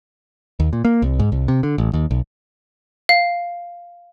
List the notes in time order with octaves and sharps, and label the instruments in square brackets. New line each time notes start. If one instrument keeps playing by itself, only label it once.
[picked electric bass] D#2
A#2
A#3
C2
G#2
C2
C3
D3
A1
D#2
B1
[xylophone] F5